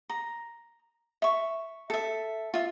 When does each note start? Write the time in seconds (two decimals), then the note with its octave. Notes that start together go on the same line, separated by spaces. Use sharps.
0.10 A#5
1.22 E5 C#6
1.90 A4 E5
2.54 F4 E5